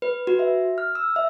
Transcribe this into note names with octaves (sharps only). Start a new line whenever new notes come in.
B4
F#4
E5
F6
E6
E5